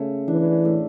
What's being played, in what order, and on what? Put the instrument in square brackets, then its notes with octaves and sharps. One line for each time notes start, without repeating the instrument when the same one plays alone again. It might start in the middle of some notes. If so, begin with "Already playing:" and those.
Already playing: [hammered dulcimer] C#3 A3
[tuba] E3 [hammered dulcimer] D4
[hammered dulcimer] A2